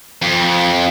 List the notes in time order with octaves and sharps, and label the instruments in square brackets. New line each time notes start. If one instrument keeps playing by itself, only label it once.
[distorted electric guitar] F2